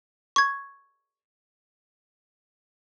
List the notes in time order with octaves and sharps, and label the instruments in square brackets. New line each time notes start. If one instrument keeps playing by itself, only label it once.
[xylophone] C#6 G#6